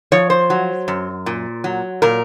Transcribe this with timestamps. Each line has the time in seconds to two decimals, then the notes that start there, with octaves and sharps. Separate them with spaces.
0.12 F3 C#5
0.30 C5
0.50 F#3
0.88 F#2
1.26 A#2
1.64 F#3
2.02 A#2 A#4